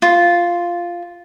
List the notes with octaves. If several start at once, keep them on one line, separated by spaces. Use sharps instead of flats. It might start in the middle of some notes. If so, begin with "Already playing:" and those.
F4